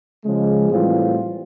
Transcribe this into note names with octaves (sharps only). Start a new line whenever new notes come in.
C#3 F3 G#3
A2 E3 G3 C4 F4